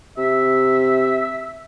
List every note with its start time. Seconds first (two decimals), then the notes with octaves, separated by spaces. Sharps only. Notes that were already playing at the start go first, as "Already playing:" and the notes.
0.18 C3 E5